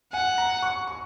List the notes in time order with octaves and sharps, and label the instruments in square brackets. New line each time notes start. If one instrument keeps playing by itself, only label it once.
[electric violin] F#5 [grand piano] G#5
[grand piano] A#5
C#6
C#6